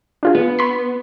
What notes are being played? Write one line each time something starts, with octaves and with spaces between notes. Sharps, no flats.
D4 F4 G#4
B3
B5 C6